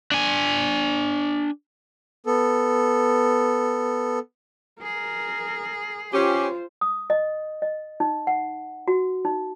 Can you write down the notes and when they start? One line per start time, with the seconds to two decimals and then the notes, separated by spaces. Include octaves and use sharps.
0.12 D4 G#5
2.26 B3 A4
4.82 G#4 A#4
6.13 C#4 F4 G4 C5
6.81 D#6
7.10 D#5
7.62 D#5
8.00 D#4
8.27 F#5
8.88 F#4
9.25 D#4